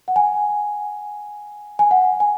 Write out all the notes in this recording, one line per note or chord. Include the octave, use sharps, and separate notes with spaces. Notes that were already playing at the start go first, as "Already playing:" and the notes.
F#5
G#5
G#5
F#5
G#5